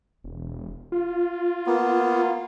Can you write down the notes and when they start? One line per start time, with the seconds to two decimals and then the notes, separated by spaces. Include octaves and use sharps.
0.24 E1
0.92 F4
1.67 A#3 B3